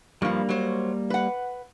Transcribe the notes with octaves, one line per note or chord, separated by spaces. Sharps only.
G2 F3 G3 A#3
F#3 C5
B4 F#5